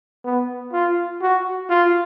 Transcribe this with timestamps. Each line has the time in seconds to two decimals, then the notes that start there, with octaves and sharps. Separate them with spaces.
0.24 B3
0.73 F4
1.22 F#4
1.69 F4